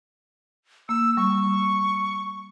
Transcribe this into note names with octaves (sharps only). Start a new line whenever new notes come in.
A#3 E6
G3 C#6